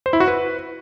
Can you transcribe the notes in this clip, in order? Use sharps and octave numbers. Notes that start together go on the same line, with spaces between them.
C5
E4
F#4
B4